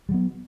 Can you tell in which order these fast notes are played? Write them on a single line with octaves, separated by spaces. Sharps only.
G3 F#3 B3